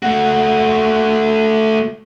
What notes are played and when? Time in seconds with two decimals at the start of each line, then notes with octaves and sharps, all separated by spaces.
0.03 A3 F#4